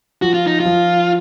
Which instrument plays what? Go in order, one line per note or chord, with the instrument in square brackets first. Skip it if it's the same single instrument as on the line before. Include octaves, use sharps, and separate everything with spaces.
[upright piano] F3 [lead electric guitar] F#4
[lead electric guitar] F4
D#4
F4
[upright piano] F3